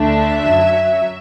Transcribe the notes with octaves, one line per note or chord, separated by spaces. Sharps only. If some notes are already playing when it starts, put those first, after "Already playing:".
Already playing: D2 D3 A3 D4 E5
F#2 F#3